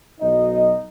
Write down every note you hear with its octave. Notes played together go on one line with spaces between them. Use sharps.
B1 F#3 D#4 D#5